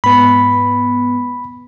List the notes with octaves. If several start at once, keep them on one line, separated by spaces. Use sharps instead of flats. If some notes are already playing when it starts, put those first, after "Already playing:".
G#2 B3 B5